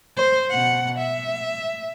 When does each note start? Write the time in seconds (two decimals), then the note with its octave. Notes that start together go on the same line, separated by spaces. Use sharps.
0.17 C5
0.50 B2 F#5
0.99 E5